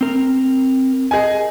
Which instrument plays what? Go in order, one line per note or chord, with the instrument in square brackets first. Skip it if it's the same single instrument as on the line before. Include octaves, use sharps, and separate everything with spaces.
[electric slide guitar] C4 A#4
[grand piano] G#4 D#5 G#5